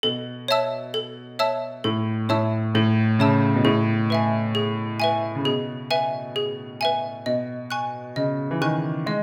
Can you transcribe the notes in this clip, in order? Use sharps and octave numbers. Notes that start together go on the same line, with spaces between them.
B2 A4
C#5 E5 A5 E6
A4
C#5 E5 A5 E6
A2 A4
A2 C#5 E5 A5 E6
A2 A4
C#3 C#5 E5 A5 E6
B2
A2 G#4
B4 E5 G#5
G#4
B4 E5 G#5
C#3
B2 G#4
B4 E5 G#5
G#4
B4 E5 G#5
B2 D#5
G#5 C#6 F#6
C#3 D#5
E3
D#3 G#5 C#6 F#6
G#3 D#5